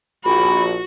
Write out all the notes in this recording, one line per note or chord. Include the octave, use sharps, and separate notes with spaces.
A#1 F#4 B5